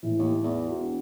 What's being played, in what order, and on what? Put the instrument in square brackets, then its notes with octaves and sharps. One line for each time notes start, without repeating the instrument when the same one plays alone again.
[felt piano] A2 E3
[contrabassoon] D#2
E2
[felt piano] F#4
[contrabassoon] E1